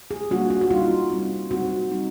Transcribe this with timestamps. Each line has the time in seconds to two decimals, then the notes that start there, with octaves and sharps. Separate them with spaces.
0.11 G#4
0.31 G3 A#3 D4 F4 F#4
0.50 F#4
0.61 F#4
0.70 G3 C4 D#4 F4
1.10 G3 C4 D#4
1.51 G3 C4 D#4 F#4
1.90 G3 C4 D#4